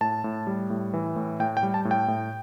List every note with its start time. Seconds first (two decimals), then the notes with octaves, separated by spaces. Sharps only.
0.01 A2 A5
0.24 A2
0.47 G3
0.70 A2
0.93 E3
1.16 A2
1.40 A2 G5
1.57 G5
1.63 G3
1.74 A5
1.85 A2
1.91 G5
2.08 A2